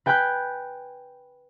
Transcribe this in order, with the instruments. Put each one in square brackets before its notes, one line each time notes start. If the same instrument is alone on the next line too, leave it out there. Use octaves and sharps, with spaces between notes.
[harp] B4 G5 G#5 B5 F#6 G6